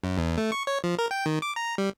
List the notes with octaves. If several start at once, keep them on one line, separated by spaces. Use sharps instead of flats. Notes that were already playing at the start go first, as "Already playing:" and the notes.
F#2
E2
A3
C#6
C#5
F3
A#4
G5
D#3
D6
A#5
G3